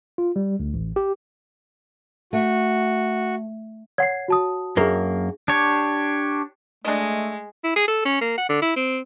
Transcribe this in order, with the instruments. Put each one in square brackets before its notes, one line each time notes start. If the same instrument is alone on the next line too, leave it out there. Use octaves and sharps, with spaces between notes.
[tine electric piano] F4
G3
D2
A1
G4
[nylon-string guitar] A3 [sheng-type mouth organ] F#4
[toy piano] C#5 F#5 [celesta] G#6 C7
[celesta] F#4 A5 D#6
[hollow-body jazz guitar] F#2 A#3 [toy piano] D4 G#4
[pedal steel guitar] D4 G4 C#5
[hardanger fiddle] G#3 [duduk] A3 [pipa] D4 D#5
[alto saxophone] E4
G#4
A4
C#4
A#3
F#5
D3
E4
C4